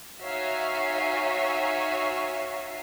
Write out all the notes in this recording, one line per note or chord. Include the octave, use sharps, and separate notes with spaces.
D#4 F#4 C#5 E5 F5 G#5